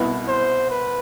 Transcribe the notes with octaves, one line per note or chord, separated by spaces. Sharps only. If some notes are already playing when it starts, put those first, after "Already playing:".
Already playing: C2 B2 B3 E4
C5
B4